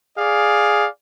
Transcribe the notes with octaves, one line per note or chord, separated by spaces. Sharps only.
G#4 D5 F5